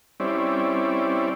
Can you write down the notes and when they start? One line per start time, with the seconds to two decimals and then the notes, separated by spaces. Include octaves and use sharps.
0.20 G3 C4 C#4 E4 D5